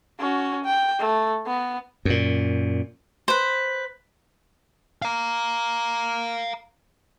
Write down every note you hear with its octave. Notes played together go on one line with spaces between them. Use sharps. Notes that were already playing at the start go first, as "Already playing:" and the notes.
C#4 F#4
G5
A3
B3
F#2 A#2
B4 C5
F5 A#5